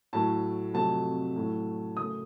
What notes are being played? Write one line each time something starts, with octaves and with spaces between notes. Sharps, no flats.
A2 F#3 A3 A5
F2 C3 F#3 A3 A5
A2 F#3 A3
F#2 C#3 A3 D#6